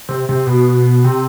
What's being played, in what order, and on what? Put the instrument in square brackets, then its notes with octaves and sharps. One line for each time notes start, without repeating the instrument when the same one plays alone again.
[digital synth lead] C3
C3
B2
C3